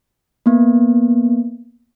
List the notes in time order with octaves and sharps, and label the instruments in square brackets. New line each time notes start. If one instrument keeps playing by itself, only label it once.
[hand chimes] A#3 B3